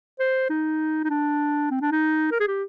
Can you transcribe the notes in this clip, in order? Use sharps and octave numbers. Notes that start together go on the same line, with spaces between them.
C5
D#4
D#4
D4
C4
D4
D#4
A#4
G#4
G4